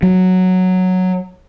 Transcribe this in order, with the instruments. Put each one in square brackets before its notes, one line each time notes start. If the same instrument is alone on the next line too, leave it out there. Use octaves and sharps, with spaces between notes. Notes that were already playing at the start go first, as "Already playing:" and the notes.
[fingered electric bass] F#3